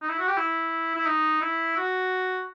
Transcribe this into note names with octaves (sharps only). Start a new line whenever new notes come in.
D#4
E4
F#4
G4
E4
E4
D#4
E4
F#4